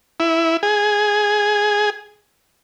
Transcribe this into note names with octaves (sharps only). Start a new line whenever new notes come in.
E4
G#4